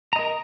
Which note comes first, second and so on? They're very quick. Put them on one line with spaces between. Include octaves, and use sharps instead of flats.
A#5 D#5 A#4